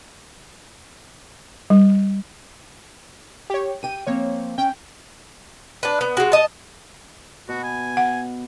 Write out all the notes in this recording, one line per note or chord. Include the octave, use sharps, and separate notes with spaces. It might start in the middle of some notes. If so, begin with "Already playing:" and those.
G3
G4 C#5
G4 G5 D#7
F3 A#3 C4 C#5
C#4 G5
D4 B4
B3
G#3 F#4
D#5 A5
B2 F#4
G#5
F#5